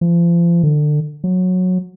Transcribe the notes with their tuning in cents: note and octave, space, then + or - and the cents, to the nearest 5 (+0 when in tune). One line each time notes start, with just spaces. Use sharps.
F3 -35
D3 +25
F#3 -15